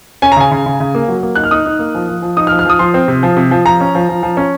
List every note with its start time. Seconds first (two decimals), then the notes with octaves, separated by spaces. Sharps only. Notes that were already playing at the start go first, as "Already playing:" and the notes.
0.22 C#4 G#5
0.32 A#5
0.37 C#3 G#5
0.51 C#3
0.66 C#3
0.80 C#3
0.95 A#3
1.08 F#3
1.23 A#3
1.36 D#4 F#6
1.44 F6
1.51 D#4 D#6
1.66 D#4
1.79 A#3
1.95 F3
2.08 F3
2.22 F3
2.37 D#4 D#6
2.47 F6
2.52 F3
2.59 F6
2.66 F3 D#6
2.79 F3 C6
2.94 C4
3.08 C3
3.23 F3
3.37 C3
3.51 F3
3.65 F3 A#5
3.81 C#4
3.95 F3
4.09 F3
4.23 F3
4.37 C#4